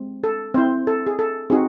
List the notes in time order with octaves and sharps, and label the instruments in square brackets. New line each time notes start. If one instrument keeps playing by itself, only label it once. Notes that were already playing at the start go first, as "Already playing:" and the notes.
Already playing: [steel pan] G#3 C4
A4
C4 E4 C5
A4
G#4
A4
C4 D#4 F#4 G#4